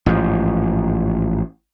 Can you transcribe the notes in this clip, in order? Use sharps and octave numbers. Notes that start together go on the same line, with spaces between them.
A1 G#2 F3